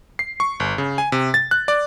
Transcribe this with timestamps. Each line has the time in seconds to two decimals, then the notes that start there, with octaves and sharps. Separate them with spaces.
0.19 C7
0.40 C#6
0.60 G1
0.78 C#3
0.98 G#5
1.12 C3
1.34 A6
1.51 F#6
1.68 D5